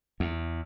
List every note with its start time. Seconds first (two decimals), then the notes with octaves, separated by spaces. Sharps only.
0.20 E2